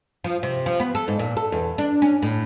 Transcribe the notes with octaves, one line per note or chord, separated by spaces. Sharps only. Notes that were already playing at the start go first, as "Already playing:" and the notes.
F3
C3
F3
B3
A4
G#2
A#2
A4
E2
D4
C#4
A2